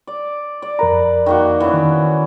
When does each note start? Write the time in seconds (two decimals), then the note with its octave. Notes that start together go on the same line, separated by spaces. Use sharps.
0.07 D5
0.62 D5
0.79 F2 A#4 B4 A#5
1.26 D#3 A#3 F#4
1.60 E3 B3 C#4
1.74 D#3